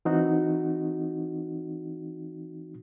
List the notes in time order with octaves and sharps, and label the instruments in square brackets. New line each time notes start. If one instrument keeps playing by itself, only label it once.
[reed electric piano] E3 C4 D#4 F#4